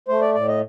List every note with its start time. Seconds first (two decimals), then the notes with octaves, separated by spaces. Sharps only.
0.08 A3 C5
0.21 D5
0.34 A2 D5
0.48 D#5